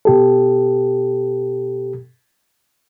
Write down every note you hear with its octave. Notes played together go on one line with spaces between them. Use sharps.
B2 G4 A4